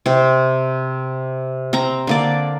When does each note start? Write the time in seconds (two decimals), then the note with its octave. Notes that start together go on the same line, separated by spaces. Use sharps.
0.06 C3 C4
1.73 C4 A#5
2.07 D3 A#3 D5